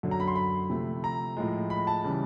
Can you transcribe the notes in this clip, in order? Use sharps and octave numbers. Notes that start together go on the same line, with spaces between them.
F#2 D3 F#3
A#5
B5
C6
B5
C3 F3 A3
A#5
A2 F3 G#3
B5
A5
C#3 E3 G3